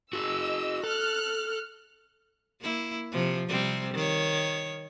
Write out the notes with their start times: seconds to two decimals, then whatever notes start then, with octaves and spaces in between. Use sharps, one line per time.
0.13 F#4 G#4 D#5 E6
0.84 A4 F6 F#6
2.60 A#3 E4
3.12 C3 F3
3.48 C3 G3 C4
3.94 D#3 C#5